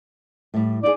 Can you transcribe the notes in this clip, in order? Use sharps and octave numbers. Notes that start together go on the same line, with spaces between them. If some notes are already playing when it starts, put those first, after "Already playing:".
A2 G3
D#4 F#4 G#4 D5